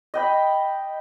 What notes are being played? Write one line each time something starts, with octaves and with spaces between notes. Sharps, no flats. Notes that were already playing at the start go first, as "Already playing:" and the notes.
D#5 G5 B5